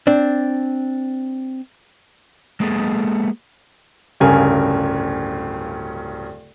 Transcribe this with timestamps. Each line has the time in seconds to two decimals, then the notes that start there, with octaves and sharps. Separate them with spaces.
0.07 C4 D4
2.60 G#3 A#3 B3 G#4 A4
4.20 D1 G2 C#3 A#4 G#5